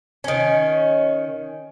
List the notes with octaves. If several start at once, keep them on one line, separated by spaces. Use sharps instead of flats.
D#3 C#4